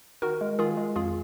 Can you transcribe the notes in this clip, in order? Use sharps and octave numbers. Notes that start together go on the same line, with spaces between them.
D#3 F#4 A#4
G#3
D#3 F4 G#4
G#3
F2 F4 G#4